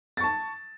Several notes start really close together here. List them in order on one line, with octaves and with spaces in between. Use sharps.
A6 C#6 A5